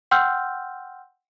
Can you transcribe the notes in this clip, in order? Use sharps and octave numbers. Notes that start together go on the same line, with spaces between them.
F#5 G5 C6 E6 F6 G6